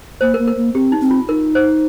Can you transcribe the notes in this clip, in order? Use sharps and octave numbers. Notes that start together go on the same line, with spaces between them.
A#3 C5
A#4
A#3
A#4
A#3
C4 G4
D#4
C4
F4
D#4 A#4
C5